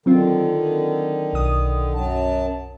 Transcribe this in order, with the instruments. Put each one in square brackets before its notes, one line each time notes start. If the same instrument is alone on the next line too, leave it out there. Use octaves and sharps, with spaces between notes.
[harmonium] D3 D#3 [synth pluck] F#3 C4 F4
[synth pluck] B1 D#6
[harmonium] F#2 F#3 A5